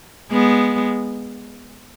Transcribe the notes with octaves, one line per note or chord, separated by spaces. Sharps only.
G#3 B3